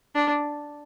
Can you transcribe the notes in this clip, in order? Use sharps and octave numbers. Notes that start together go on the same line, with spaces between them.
D4